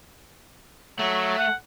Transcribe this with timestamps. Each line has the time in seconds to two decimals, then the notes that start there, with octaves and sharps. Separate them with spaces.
0.99 F#3 A3
1.38 F#5